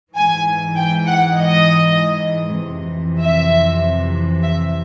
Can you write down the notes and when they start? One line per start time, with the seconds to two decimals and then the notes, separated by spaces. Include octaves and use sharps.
0.15 G#2 E3 G#5
0.76 G5
1.06 F#5
1.37 D#5
2.59 F2 C3 E3
3.20 E5
4.42 E5